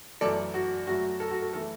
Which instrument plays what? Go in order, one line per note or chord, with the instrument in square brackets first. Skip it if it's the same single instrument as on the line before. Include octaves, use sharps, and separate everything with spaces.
[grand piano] F#2 E3 A3 A4 D5
F#4
F#2 F#3 A3 F#4
A4
F#4
A4
E3 A3 A4